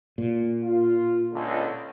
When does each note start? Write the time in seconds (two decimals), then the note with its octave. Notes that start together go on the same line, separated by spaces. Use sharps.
0.18 A#2
0.63 F4
1.33 C#2 D3